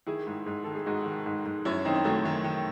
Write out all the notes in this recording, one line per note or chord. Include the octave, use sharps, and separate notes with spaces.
D#3 E4 G#4
G#2
G#2
D#3 A4
G#4
G#2 D#4 F#4
D#3
G#2
G#2
F#2 C#4 E4
D#3 C4 D#4
C4
D#3 F#3 A3
D#3
D#3